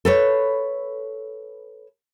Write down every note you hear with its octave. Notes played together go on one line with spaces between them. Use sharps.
A4 B4 C#5